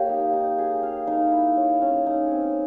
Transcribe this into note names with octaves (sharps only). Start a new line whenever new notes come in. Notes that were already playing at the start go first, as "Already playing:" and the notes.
Already playing: A#3 G4 C#5
D#4
D#4
G#4
F5
D#4
E4
C#5
C#4
D#4
C4